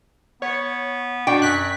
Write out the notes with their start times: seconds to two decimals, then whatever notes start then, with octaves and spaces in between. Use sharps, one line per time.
0.42 B3 C#5
1.27 B2 D4 D5 G5 C#6
1.42 F#2 F#6 B6